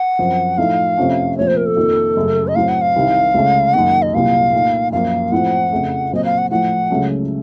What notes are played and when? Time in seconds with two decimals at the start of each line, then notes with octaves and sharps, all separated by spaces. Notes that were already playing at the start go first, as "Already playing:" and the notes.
Already playing: F#5
0.19 F#2 F3 C4
0.58 A2 F3 A3 D#4 F5
0.98 F2 C3 F3 A3 C#4
1.37 A#2 F3 A3 C4 C#5
1.47 C5
1.57 A#4
1.66 A4
1.76 F2 D#3 A#3 F4
2.17 F#2 C#3 A3
2.48 D#5
2.55 A2 F#3 C4 F5
2.69 F#5
2.81 F5
2.96 C2 C3 D#3
3.34 C#2 C#3 A3 C#4
3.74 F#2 D#3 A#3 F#5
4.02 D#5
4.13 C2 A#2 F#3 A#3 F5
4.53 A#2 A3 D#4
4.92 F#2 F3 A#3 F5
5.32 A2 F3 C4 F4 F#5
5.72 F2 C#3 A3
6.12 A#2 F#3 C4 D#5
6.25 F5
6.38 F#5
6.51 A2 F3 A3 F#5
6.90 C#2 C#3 F#3 A3 C#4